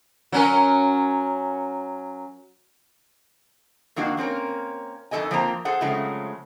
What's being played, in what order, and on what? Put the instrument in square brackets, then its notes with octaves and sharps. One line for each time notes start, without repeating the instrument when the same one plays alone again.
[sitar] F#3 C#4 A#4
[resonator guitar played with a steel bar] F2 D#3 A#3 D4 F#4 F5
A#3 C4 C#4 A#4
F2 D#3 A#3 A4 D#5 G#5
F3 A#3 C4 C5 G#5 A#5
G#4 A4 C5 F#5
C#3 F3 F#3 G#3 A3 C4